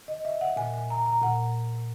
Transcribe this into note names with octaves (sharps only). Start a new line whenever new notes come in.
D#5
E5
F#5
A#2 G#5
G#5
A#5
A#5
A#2 F#5